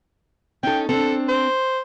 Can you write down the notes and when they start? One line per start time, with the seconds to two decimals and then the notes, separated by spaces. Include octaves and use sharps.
0.63 C#4 D#4 A4 G5
0.89 C4 D4 A4
1.28 C5